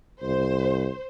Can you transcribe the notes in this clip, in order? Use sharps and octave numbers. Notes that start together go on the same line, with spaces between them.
C2 C5